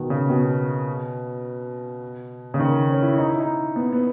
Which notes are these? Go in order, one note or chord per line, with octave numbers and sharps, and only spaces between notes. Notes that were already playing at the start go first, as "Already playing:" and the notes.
Already playing: B2 D#3
C#3
B2
C#3
D#3
C#4
E4
D#4
E4
D#4
B3
B3